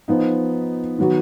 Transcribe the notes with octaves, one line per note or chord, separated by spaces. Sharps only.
F3 B3 D#4
D#3 F#3 B3 F#4